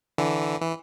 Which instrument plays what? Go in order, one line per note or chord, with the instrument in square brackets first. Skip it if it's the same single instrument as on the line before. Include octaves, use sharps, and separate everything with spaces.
[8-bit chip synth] D3 E3
E3